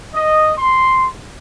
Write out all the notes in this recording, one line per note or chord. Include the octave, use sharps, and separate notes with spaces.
D#5
C6